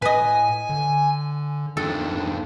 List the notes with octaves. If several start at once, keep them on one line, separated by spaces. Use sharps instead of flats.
A2 B4 D#5 G#5
D3
F2 D#3 D4 A4